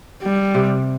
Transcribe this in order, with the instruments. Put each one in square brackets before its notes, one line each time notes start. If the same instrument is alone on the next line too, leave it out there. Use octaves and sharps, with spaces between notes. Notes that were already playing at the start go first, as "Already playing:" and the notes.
[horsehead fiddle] G3
[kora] C3